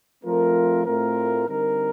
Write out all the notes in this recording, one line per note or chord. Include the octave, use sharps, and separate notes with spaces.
F3 A3 C4 F4 A#4
A2 A3 C4 F4 A#4
D3 G3 C4 D#4 A#4